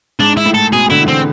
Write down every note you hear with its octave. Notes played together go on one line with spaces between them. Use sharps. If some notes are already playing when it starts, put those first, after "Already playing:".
G#2 D4
E4
A2
A4
B2 G#4
D3 E4
E3 C4